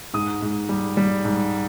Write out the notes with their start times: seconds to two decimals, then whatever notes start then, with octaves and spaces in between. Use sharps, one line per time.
0.14 G#2 D#6
0.42 G#2
0.69 G3
0.97 G3
1.25 G#2